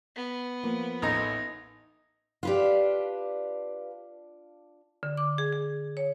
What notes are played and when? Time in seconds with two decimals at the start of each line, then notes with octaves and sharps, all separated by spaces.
0.16 B3
0.63 F3 A#3
1.02 A1 D#4 A4 A#5
2.43 D4 F4 G4 B4 F5
5.03 D3
5.17 D6
5.38 G#4
5.53 G#4
5.97 C#5